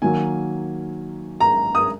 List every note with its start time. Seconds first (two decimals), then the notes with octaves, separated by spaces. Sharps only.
0.02 D#3 F#3 A#3 G#5
1.40 A#5
1.75 D#6